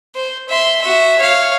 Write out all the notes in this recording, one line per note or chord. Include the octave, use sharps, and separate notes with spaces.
C5
E5 C6
F#4 E5
C#5 F5